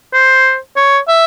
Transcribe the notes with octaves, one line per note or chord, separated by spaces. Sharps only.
C5
C#5
E5